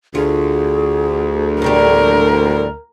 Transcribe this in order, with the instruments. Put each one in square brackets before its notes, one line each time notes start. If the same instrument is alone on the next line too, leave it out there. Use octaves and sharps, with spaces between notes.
[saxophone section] D2 [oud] F4 [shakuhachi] G#4
[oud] A2 G3 G4 [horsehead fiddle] A#4